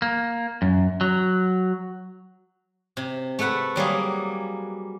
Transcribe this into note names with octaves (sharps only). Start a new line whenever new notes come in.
A#3
F#2
F#3
C3
A3 A4 B4 F#5 B5
F#3 G3 A#3 G#4